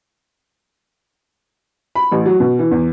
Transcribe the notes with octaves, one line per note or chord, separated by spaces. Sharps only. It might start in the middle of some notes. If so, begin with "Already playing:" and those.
B5
A1
F#3
B2
E3
E2